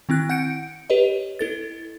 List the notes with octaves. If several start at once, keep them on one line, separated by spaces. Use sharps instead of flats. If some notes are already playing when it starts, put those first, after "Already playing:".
D#3 C4 E4 F#6
F#5 G6 C#7 D7
G4 B4 C#5 D#5
E4 A4 A6